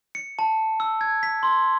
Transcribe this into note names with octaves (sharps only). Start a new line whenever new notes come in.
C#7
A5
E6
G#6
B6
C6